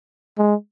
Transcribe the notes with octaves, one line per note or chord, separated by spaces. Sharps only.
G#3